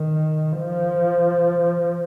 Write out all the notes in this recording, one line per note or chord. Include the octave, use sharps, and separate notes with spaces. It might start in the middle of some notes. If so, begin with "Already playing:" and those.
Already playing: D#3
F3